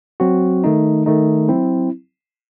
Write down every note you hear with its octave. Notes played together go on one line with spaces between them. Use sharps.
F#3 C4 F#4
D#3 A3 D#4
D#3 A3 D#4
F#3 C4 E4